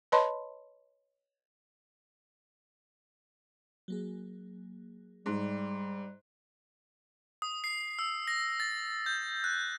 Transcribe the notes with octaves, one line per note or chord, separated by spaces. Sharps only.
B4 C#5 D#5 A5 B5 C6
F#3 A#3 G#4
G#2 G3
D#6
C7
E6
A#6
A6
G6
F#6